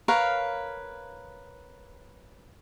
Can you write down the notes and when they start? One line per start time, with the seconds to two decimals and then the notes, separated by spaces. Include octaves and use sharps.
0.08 A#4 B4 C#5 F5